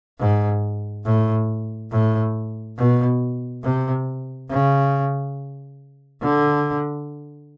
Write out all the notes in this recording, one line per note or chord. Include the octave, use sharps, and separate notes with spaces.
G#2
A2
A2
B2
C3
C#3
D3